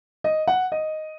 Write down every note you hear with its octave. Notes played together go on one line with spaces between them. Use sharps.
D#5
F#5
D#5